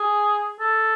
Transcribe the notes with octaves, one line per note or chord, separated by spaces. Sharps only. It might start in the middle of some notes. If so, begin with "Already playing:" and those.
Already playing: G#4
A4